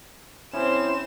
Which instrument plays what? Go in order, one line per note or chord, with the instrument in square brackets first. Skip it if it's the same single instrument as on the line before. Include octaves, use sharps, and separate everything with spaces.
[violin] C4 E7 [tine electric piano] C#4 E4 [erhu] C5